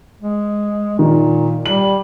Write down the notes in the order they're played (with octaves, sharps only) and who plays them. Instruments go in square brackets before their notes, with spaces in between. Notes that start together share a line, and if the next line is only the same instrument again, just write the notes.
[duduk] G#3
[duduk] A#2 [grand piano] D#3
[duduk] G3 [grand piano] F#7